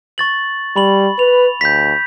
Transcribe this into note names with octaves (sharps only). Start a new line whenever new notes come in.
C#6 A6 F#7
G3 B5 F#7
B4 F7
D2 G6 B6